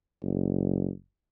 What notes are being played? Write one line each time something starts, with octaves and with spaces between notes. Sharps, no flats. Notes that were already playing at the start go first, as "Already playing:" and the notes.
F#1